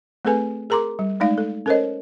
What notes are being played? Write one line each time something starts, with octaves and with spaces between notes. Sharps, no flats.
A3 C4 G#4 A4 B4 G#5
G#4 A#4 A#5 C6 D6
G3
G#3 A3 D#4 D5 F5
A4
C#4 A4 A#4 C5 C#5 D#5